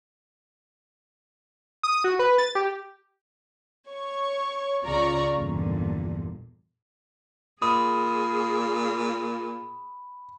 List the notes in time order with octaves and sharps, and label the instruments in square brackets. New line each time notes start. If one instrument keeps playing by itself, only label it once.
[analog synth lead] D#6
F#4
B4
A6
G4
[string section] C#5 C#6
C#2 C#3 F4 D5 A#5 C#6
A#1 E2 G2 A#2 D3
[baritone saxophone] A#2 [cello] G#4 [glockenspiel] B5 [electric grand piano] D#6